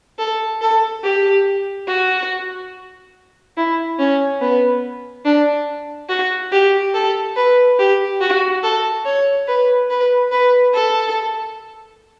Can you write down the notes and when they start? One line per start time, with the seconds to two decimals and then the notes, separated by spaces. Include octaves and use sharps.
0.19 A4
0.62 A4
1.04 G4
1.88 F#4
3.57 E4
3.99 C#4
4.41 B3
5.25 D4
6.09 F#4
6.52 G4
6.94 A4
7.36 B4
7.79 G4
8.21 F#4
8.63 A4
9.05 C#5
9.48 B4
9.90 B4
10.31 B4
10.74 A4